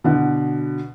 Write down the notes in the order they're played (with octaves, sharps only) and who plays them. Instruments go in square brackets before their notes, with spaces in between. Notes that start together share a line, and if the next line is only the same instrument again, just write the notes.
[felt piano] B2 D3